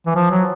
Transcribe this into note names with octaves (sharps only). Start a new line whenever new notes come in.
E3
F3
F#3